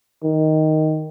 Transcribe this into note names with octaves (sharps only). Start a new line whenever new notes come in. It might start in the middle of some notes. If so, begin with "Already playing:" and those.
D#3